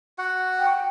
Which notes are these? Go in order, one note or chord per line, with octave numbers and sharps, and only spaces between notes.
F#4 F#5
G5